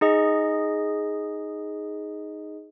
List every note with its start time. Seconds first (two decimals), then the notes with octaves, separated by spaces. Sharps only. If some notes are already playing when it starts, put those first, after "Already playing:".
0.01 D#4 G#4 D#5